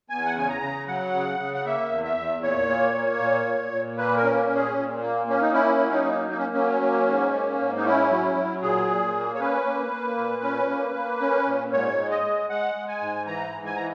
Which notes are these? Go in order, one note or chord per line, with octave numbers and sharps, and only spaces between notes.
E2 G#5
F#5
C#3 G#5
A#5
C#3
F#3 F#5
C#3
C#3
F#5
A#3 E5
E2
E5
E2
A#2 C#5
A#3
A#3
A#2
A#2
A#2
A#3 B4
A#4
C#4
A#2
G#4
A#2
A#3
A#3 C#4
D#4
C#4 E4
F#3
D#4
A#3
A#3 D#4
C#4
F#3 C#4
A#3
G#2
A#3
G#2
D#4
C#4 E4
F#3
F#3
A#2 G#4
A#2
A#3
C#5
C#4 B4
A#3
A#3
A#2
C#4
A#3
A#3
C#4
A#2
G#2 C#5
G#3
D#5
G#3
G#3 F#5
G#3
G#5
G#2
E3 A#5
G#2
G#5
E3 A#5